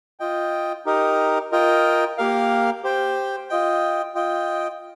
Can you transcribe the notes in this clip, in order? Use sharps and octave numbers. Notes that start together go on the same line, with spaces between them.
F4 D#5 G5
D#4 G4 A#4 D#5
F4 A#4 D#5 G5
A#3 G4 A#4 F5
G4 C5 G5
F4 D#5 G5
F4 D#5 G5